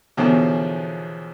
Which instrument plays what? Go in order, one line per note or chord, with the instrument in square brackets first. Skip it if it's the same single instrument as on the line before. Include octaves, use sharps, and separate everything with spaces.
[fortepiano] E2 B2 D3 D#3 F3 C#4